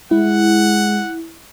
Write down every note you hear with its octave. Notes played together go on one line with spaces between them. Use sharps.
G#3 E4 F#5